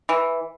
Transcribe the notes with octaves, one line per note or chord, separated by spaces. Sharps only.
E3